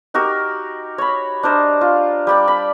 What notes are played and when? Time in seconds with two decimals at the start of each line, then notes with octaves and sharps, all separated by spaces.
0.14 D#4 F#4 G4 A#4
0.98 C#5 B5
1.43 D4 A#4 C5 D#5
1.81 F4
2.27 G3 G4 D5
2.48 B5